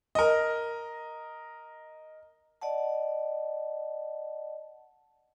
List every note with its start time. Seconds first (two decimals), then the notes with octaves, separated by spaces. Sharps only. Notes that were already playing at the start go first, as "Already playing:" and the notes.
0.15 A#4 D#5
2.62 D5 D#5 F#5 A5